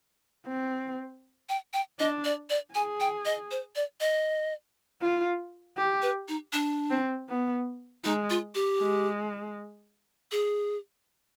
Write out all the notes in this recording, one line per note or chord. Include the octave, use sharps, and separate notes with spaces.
C4
G5
G5
D4 D#5
D5
D5
G#4 G#5
G5
D#5
C5
D5
D#5
F4
G4
B4
D#4
D4
C4
B3
G#3 D#4
F4
G4
G#3
G#4